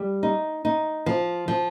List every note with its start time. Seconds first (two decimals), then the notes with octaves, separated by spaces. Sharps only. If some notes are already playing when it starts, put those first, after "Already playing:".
Already playing: G3
0.23 D#4
0.65 D#4
1.06 F3
1.48 F3